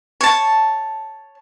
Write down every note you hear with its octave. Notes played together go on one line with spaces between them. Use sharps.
C#5 A5